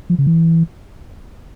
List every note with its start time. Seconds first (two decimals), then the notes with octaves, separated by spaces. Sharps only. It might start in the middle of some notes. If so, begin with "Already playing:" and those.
0.10 F3
0.19 C#3
0.27 E3